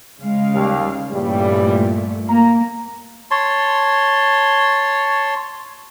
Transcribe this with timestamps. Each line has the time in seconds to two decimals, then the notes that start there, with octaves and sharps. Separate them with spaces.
0.20 C#3 G#3 F5
0.54 D#2 G3
1.11 G2 A#2 C#3 E3 G3 A3
2.28 A#3 A#5
3.31 C#5 A5 C6